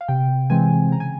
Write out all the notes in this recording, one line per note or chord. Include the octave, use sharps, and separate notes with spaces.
F5
C3 G5
E3 G#3 C4 G#5
C#3 A#5
G#5